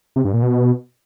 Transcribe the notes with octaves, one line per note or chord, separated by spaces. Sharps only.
C3
G2
A#2
B2